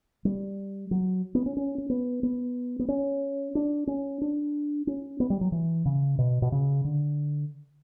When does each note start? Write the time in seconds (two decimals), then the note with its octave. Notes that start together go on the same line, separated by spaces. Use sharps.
0.25 G3
0.91 F#3
1.35 B3
1.46 C#4
1.57 C#4
1.78 C#4
1.90 B3
2.23 B3
2.79 B3
2.88 C#4
3.55 D4
3.87 C#4
4.21 D4
4.87 C#4
5.20 B3
5.30 G3
5.41 F#3
5.52 E3
5.85 C#3
6.19 B2
6.42 B2
6.52 C#3
6.85 D3